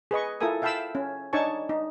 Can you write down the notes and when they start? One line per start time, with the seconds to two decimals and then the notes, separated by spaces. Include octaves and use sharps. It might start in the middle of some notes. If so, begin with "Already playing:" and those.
0.11 G#4 B4 D#5 C#6
0.40 E4 F4 A4 A#4 G#5 D#6
0.62 E5 F5 G5 A5 B5 E6
0.95 C#4
1.33 D4 D#4 C#5 G#5 A5 C#6
1.69 D#4